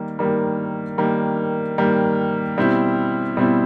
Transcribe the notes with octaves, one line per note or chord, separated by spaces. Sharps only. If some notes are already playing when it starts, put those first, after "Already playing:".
Already playing: D#3 G3 A#3
D#3 G3 A#3
D#3 G3 A#3
D#3 G3 A#3
B2 G3 C4 E4
B2 G3 C4 E4